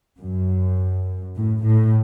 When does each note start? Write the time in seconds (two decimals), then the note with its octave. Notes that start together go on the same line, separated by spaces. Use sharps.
0.20 F#2
1.37 A2
1.66 A2